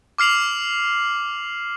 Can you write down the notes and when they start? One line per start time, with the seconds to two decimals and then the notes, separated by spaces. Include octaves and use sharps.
0.18 D6 F6 C7 F7 F#7